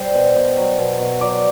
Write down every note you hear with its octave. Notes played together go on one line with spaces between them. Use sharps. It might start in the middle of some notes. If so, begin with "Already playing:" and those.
Already playing: G3 C5
B2
B2
F#3
B2
B2
F#3 D5